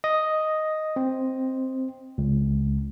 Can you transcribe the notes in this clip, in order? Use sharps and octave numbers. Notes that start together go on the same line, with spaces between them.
D#5
C4
C#2